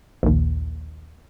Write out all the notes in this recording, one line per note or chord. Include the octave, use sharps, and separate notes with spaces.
A#1 D#2